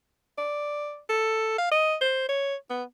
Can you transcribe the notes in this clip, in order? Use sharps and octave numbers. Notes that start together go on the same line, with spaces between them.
D5
A4
F5
D#5
C5
C#5
B3